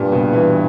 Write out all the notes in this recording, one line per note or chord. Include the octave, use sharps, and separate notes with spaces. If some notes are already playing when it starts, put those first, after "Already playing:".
Already playing: G2 A#2
B2
E3